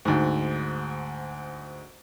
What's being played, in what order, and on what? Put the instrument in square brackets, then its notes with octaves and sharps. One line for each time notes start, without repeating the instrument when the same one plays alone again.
[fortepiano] D2 G#2